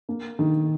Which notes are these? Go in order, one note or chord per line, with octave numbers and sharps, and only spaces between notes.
A#3
D#3